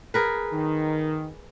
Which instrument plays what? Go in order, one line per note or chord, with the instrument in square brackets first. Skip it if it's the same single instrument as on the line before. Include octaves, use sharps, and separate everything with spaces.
[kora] G#4 A#4 B4
[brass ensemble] D#3